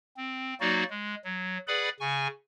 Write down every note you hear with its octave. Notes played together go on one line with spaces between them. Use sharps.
C4
F#3 A#3 D#4 F#4 D5
G#3
F#3
G#4 B4 D5 F#5 B5
C#3 G#5 C#6